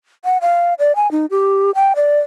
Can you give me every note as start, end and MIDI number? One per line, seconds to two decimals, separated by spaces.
0.25 0.38 78
0.41 0.74 77
0.79 0.95 74
0.96 1.10 80
1.11 1.26 63
1.31 1.71 67
1.75 1.93 79
1.96 2.20 74